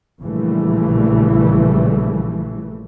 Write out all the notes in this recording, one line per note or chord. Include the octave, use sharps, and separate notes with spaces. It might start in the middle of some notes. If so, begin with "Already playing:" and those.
A#1 A#2 C#3 E3 G3 A3